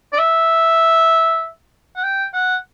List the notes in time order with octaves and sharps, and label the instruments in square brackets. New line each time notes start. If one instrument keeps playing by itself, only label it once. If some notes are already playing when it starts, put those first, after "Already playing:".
[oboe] D5
E5
F#5
G5
F#5